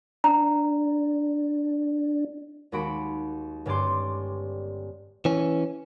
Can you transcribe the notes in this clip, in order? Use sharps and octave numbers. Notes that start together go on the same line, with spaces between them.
D4 A#5
D#2 G#3 F#4 B5 D7
G1 G2 C#4 D5 C6
E3 C#4